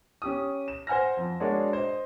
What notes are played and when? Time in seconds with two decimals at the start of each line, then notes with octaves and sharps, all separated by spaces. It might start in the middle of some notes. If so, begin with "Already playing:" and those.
0.22 C#4 G4 D#6
0.68 E7
0.87 C5 F#5 G#5 F6 A#6
1.17 F2
1.40 G#3 D4 F#4 A#4 C#5 D5
1.73 C5 D#5